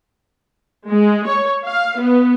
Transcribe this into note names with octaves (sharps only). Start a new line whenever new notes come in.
G#3
C#5
F5
B3